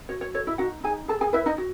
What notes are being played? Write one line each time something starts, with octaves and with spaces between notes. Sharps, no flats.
F#4 C#5
C#5
A4 C#5
E4 E5
D#4 F#4 F#5
D#4 G#4 G#5
G#4 A4 A5
G#4 G#5
E4 B4 E5
D#4 D#5
F#4